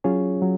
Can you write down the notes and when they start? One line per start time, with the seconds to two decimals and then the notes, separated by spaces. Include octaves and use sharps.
0.04 F#3 C#4 F4 G#4 C#5
0.42 F#3